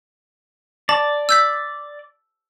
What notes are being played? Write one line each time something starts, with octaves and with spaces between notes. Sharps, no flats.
D5 A5
E6 G6 B6